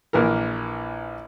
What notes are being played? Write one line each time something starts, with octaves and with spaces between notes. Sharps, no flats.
A#1 E3 A#4